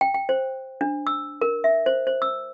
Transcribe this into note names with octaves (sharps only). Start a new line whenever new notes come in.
G5
G5
C5
D4
E6
A#4
E5
C5
C5
E6